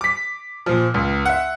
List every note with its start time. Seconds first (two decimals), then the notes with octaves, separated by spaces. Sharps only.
0.01 D6 B6
0.66 A#2 F3
0.94 C#2
1.25 E5 F#5